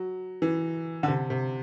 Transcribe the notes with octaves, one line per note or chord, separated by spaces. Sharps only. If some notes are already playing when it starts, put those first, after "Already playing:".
Already playing: F#3
E3
D3
C3
C3